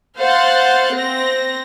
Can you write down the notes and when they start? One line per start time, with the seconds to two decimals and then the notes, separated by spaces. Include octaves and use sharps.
0.18 C5 F5 F#5 F#6 A6
0.94 C4 A#6